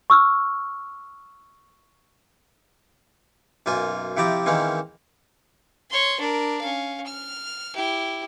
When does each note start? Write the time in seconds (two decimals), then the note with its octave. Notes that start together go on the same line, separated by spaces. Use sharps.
0.10 C#6 E6 F6
3.66 B1 F#2 A#3 F4 G#5
4.17 C3 F3 E4 D5 G5 A#5
4.46 D#3 E3 G#3 A#3 C4 C#4
5.90 C#5 C6
6.19 D4 A#4
6.61 C#4 F5
7.06 F6
7.74 E4 G4